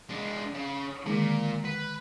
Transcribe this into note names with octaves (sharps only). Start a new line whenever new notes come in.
G#3 D4
C#3
A#2 D3 D#3 G#3
B4